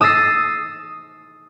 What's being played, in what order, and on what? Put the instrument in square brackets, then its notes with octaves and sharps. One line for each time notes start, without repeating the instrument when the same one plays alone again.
[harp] D#6 E6 A6 A#6 C7